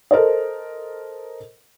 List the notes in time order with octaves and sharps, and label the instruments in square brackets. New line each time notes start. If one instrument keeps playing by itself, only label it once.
[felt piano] A4 A#4 C5 D#5